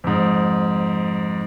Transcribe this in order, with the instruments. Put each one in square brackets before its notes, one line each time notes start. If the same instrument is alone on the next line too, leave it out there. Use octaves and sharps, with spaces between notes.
[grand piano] F2 G#2